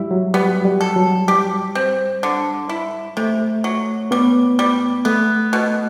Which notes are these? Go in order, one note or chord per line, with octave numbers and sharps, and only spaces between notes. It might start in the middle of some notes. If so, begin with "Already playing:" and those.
Already playing: F#3 G3 E4
F#3
G3 B3
G3
A4
F#3
G3 G4
C4
D3
E4
C3 A3
F#3
G3 B3
G3
A3 B3
B2